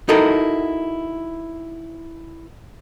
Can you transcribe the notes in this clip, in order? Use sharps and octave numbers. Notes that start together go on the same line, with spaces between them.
D#4 E4 F#4 A4 A#4